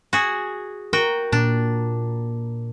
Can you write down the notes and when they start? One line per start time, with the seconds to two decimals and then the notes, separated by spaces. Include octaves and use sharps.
0.13 F#4 G#4
0.93 F#4 A#4 G5
1.32 A#2 D4